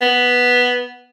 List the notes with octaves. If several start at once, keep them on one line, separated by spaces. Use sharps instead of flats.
B3